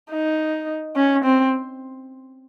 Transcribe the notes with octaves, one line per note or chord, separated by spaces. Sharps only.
D#4
C#4
C4